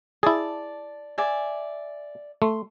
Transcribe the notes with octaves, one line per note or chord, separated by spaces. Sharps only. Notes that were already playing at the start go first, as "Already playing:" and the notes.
E4 G#4 D5 A5
D5 E5 G#5
A3 C6